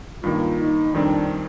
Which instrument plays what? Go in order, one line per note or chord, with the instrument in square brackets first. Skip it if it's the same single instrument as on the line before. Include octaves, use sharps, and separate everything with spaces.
[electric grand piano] G2 D#3 A#3 [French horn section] F4
[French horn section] D#4
[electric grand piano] F2 D#3 G3 C4 [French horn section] D4